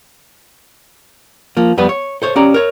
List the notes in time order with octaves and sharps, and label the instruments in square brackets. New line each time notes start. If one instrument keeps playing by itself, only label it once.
[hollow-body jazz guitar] F3 A#3
F2 G3 B3 B4
C#5
A4 C5 C#5
C#4 G4 D5 A#5
A#4 C#5